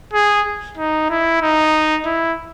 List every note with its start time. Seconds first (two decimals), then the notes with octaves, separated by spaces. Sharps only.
0.13 G#4
0.77 D#4
1.10 E4
1.42 D#4
2.06 E4